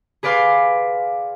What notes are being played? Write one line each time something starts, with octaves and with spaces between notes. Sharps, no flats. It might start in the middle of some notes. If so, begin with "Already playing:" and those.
G#4 B4 D5 F5 C6 D6